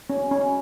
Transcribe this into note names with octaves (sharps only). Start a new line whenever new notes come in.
C#4
C#4